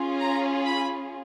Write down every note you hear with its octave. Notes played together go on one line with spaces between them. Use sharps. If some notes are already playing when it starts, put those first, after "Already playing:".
Already playing: C#4 F4 G#4
A#5
B5